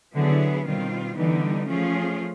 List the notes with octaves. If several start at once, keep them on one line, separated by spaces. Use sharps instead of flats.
D3 F#3 B3 E4 G#4
B2 D#3 G3 C4 F4
D3 E3 G3 B3 D#4
F3 A3 C#4 F4 G#4